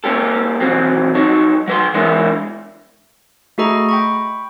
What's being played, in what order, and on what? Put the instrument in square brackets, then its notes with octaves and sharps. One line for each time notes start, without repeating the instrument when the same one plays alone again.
[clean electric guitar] A#3 C#4 G4 A4
E2 B2 F#3 C4
F#3 D#4 A4 C#5
F#3 B4 C6
E3 G#3 D4 E4 A#4 C#5
[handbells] A3 F#4 G#4 A4 D#5 A#5
G5 B5 C#6